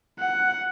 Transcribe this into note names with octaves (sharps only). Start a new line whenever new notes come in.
F#5